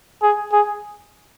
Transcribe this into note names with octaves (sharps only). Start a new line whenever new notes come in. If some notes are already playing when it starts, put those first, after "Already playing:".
G#4
G#4